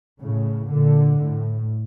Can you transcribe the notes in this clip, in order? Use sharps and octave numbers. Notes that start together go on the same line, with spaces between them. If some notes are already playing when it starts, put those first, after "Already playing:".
A2 C#3
A#2 D3
A2